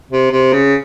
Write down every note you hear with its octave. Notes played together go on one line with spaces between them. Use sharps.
C3
C3
C#3